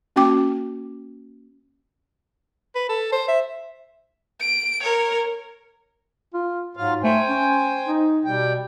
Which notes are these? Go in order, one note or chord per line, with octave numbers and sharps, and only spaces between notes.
A#3 C#4 F#4 G5 D6
B4
A4
C5
E5
D7
A#4 C#5
F4
G#2 F#3 F4 F5
A3 C5 G5 G#5
C#4
D#4
B2 G3 G5